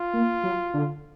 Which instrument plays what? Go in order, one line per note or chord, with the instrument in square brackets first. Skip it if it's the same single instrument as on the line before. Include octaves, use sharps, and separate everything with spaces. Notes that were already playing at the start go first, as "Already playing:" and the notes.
Already playing: [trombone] F4
[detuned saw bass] A#3
F#3
D3